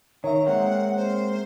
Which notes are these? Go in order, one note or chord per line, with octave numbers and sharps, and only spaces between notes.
D#3 C#5 E5 A#5
G#3 A#3 C4 F#5
C5